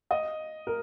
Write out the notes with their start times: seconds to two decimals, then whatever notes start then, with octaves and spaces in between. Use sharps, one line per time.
0.11 D#5
0.67 A#4